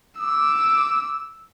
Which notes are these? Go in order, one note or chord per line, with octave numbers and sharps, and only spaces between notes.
D6 E6